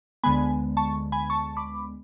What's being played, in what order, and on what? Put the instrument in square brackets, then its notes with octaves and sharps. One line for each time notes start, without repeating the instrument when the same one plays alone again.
[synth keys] D2 D3 G#3 B3 G#5 B5
A5 C#6
G#5 B5
A5 C#6
B5 D6